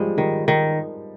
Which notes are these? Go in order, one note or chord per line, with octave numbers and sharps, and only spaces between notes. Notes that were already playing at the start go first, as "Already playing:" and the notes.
Already playing: F3 G3 G#3
D#3 G3
D#3